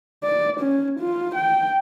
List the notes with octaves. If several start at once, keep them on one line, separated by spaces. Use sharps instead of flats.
D5
C#4
F4
G5